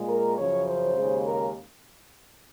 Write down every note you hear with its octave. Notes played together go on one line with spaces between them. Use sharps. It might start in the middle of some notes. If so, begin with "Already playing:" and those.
Already playing: A#2 G#3
A#4
F#2 C#3 F3 C#5
C5
D#2 C#3 G#3
A#4